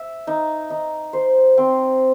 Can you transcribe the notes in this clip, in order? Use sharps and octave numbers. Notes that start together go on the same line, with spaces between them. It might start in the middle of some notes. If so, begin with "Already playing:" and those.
Already playing: E5
D#4
D#4
C5
C4